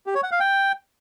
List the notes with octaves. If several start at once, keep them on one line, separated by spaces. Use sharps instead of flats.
G4
C#5
F#5
F5
G5